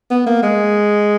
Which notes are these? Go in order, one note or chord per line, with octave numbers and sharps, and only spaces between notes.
B3
A#3
G#3